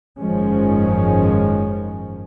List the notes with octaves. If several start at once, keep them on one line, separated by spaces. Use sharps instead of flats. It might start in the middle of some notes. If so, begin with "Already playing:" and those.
F#1 G#2 D#3 F3 G#3 C#4